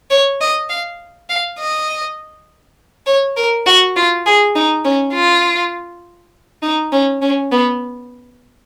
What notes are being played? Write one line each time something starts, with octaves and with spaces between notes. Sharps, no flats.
C#5
D#5
F5
F5
D#5
C#5
A#4
F#4
F4
G#4
D#4
C#4
F4
D#4
C#4
C#4
B3